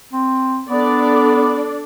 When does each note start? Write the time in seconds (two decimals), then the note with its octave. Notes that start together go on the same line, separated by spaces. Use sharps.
0.13 C4
0.69 B3 D4 A4 D5